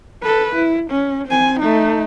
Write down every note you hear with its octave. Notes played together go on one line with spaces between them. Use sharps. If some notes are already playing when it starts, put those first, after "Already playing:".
A4 B4
E4
C#4
C4 G#5
A3 D#4